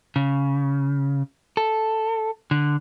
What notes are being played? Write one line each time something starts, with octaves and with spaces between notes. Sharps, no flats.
C#3
A4
D3